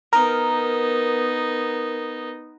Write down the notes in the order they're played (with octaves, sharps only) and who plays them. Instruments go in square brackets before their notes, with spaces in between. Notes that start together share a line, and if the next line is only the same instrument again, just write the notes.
[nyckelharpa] B3 D#4 [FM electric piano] A#4